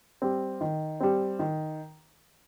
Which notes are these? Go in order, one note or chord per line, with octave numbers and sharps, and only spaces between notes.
G3 C4
D#3
G3 C4
D#3